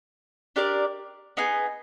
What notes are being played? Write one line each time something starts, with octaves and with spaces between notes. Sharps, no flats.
D4 G4 A#4 D5
B3 D#4 G#4